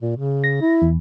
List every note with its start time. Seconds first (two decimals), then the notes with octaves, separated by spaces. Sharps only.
0.02 A#2
0.16 C#3
0.44 A#6
0.62 E4
0.82 E2